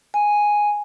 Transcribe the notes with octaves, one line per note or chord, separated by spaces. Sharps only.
G#5